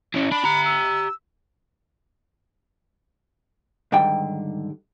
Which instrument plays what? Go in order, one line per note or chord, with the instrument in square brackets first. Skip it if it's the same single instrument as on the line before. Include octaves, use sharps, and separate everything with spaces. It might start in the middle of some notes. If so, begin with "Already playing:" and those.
[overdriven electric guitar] E3 C#4
[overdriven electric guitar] D4 [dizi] B5
[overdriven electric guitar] G4 A#5
[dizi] E6
[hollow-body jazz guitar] G#2 D3 D#3 G3 G5